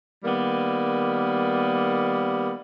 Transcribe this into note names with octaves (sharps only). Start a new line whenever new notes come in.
D#3 G3 A#3 B3